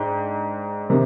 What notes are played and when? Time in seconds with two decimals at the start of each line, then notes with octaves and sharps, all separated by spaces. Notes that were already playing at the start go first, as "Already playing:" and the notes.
Already playing: G#2 D4 G5
0.90 C3 D#3